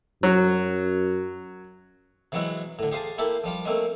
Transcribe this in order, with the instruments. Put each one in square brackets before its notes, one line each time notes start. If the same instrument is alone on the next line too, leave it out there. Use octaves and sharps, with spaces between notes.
[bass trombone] F#2 [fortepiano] F#3
[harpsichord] C3 E3 F#3 G#3 E4 F#4
A2 D3
G4 G#4 C5 F5 G#5 A5
A#3 E4 G4 A4 E5
F3 G3 F4
A3 A#3 C4 C#4 D#5